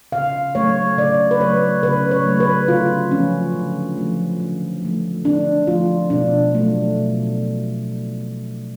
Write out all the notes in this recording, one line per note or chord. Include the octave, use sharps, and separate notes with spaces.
C#3 F5
F#3 A3 C#5
C#3 D5
B4
F#3 A3 C#5
C#3 B4
C#5
F#3 A3
B4
D3 F4
F3 A3 C#4
D3
F3 A3
D3
F3 A3
D3 D4
F3 A3 F4
B2 D4
F#3 A3
B2